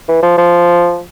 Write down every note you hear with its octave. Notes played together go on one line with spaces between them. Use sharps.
E3
F3
F3